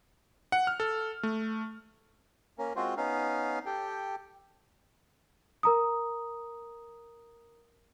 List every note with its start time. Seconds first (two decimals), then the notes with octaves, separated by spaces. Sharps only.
0.52 F#5
0.67 F6
0.80 A4
1.23 A3
2.58 A#3 C#4 A#4
2.76 G#3 C4 F4 F#4 C5
2.97 B3 C#4 D#4 F5
3.66 G4 A4 G5
5.63 A#4 A#5 D#6